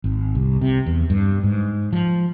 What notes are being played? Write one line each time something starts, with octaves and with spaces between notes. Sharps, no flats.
G#1
C2
C3
E2
G2
G#2
F3